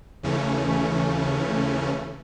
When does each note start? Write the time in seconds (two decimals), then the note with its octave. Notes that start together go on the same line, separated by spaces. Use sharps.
0.23 D#2 C#3 E3 A3 C#4